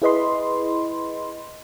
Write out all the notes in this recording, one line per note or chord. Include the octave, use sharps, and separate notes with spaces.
E4 G#4 B4 D#5 B5 C6